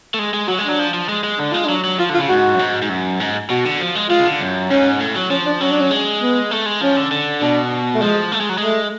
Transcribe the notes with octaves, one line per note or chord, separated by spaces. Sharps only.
A3
G#3
G#3
F#3 F#4
G#3
F#3 D4
F3
F3
G#3
G#3
D3 D4
G#3 F4
F#3 D4
F#3
F3 F4
D3 F4
C#3
G#2 F#4
F#2
G#2
G#2
F#2
G#2
B2 F#4
D3
F3
G#3
G#3 F4
C#3
D3
F#2
G#2 C#4
A2
F#3
F3 C#4
D4
F#3 C#4
D4
C#4
G#3
B3
A3
G#3
F3 C#4
D3
D3
B2 D4
A3
F3 G#3
A3
G#3
F#3
G#3 A3